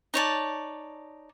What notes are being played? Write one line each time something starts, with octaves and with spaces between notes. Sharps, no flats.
D#4 C#5 D5 A5